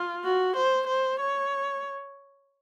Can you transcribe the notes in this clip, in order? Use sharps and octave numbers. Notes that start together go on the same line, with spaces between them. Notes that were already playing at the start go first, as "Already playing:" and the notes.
Already playing: F4
F#4
C5
C5
C#5